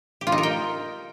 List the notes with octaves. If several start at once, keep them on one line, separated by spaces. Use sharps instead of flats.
G4
F4
D#4
A#4
G5